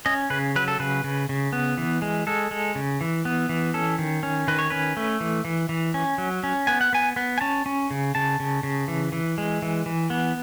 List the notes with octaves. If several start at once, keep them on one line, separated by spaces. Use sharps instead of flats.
C#4 D#5
C#3 B4
F#3 B4
A4
C#3 B4
C#3
C#3
B3
E3
G#3
G#3 A4
G#3
C#3
E3
B3
E3
C#4 A4
D#3
C#4
D#3 B4
C#5
C#4 B4
A3
E3
E3
E3
C#4
F#3
C#4
B3 G#5
F#5
B3 G#5
B3
G#5
C#4 A5
C#4
C#3
C#3 A5
C#3
C#3
E3
E3
G#3
E3
E3
B3